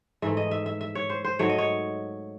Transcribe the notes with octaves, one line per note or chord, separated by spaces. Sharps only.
G#2 E3 A3 E5
D#5
E5
E5
E5
C#5
C5
C5
G#2 F#3 A3 C#5
D#5
C#5